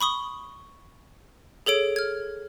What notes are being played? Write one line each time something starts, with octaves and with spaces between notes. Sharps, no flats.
B5 C#6 D#6 G7
G#4 A4 C#5 D7
F6 G#6